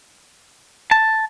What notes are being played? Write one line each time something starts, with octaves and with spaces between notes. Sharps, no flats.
A5